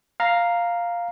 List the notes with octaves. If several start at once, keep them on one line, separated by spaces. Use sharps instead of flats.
F5 A#5